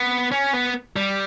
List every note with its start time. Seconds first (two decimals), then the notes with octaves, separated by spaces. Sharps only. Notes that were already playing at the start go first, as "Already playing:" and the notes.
Already playing: B3
0.32 C#4
0.53 B3
0.96 G3